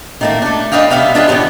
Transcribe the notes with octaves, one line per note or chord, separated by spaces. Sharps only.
D#3 A3 A#3
A3 D4
D4 B4 D#5 F5 G5
C3 G3 B3 E5 F5 G5
D4 F4 G#4 B4 D#5 G5
D3 E3 B3 C#4 G4